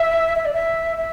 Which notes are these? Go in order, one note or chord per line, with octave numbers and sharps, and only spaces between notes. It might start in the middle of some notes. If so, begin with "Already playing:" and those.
Already playing: E5
E5
D5
E5
E5